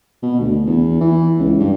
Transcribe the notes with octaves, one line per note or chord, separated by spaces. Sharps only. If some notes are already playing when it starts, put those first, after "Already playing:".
B2
D2
E2
E3
C#2
G2